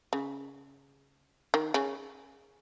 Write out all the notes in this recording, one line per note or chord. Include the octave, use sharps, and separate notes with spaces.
C#3
D#3
C#3